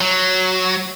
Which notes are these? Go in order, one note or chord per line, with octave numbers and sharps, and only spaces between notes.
F#3